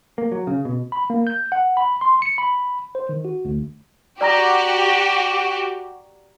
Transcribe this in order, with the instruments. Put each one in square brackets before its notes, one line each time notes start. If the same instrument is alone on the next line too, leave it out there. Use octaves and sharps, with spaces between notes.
[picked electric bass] A#3
F#3
C#3
B2
[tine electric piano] B5
A#3
G6
F#5
B5
C6
C#7
B5
C5
D#3
F#4
D2
[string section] F#4 G4 [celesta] D5 A#5 A#6